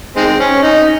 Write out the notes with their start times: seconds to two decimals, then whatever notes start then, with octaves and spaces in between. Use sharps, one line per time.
0.16 D#3 G#3 C4
0.40 C#4
0.63 D#4